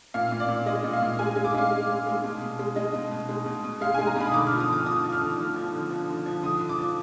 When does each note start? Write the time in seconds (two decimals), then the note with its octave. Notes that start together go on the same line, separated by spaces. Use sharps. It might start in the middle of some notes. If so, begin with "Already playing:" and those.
0.14 A#2 F5
0.32 A#2
0.40 D5
0.49 A#2
0.66 G#3 D#5
0.84 A#2
0.93 F5
1.02 A#2
1.19 G#3 G#5
1.36 G#3
1.45 D6
1.55 G#3 F5
1.71 G#3
1.89 G#3
2.07 G#3
2.24 B2
2.42 B2
2.59 G#3
2.76 G#3 D#5
2.94 B2
3.11 B2
3.29 G#3
3.46 B2
3.64 B2
3.81 G#3 F5
3.94 G#3 G#5
4.07 A#5
4.16 B2 B5
4.27 D#6
4.34 D3 D6
4.47 F3 F6
4.60 D#6
4.68 D3 D6
4.86 F3 D#6
5.04 F3
5.12 F6
5.21 D3
5.38 D3
5.56 F3
5.73 D3
5.90 F3
6.09 D3
6.26 F3
6.43 D3 D#6
6.61 D3
6.69 D6
6.78 F3